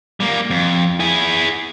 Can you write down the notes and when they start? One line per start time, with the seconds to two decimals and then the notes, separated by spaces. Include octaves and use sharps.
0.20 G3 A#3
0.50 F2
1.00 E4 G#4